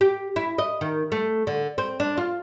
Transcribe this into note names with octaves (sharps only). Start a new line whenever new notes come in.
G4
E4
D#5
D#3
A3
D3
C4
D4
F4